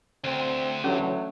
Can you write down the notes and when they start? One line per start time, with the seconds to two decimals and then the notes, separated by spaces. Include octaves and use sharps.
0.24 D2 C4
0.84 D3 E3 F#3 A3 C#4